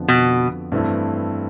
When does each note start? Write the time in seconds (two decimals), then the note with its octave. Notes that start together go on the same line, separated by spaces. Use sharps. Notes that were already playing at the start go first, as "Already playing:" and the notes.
Already playing: F2 D3 F3 B3
0.08 B2
0.72 G2 E3 A3 C4 E4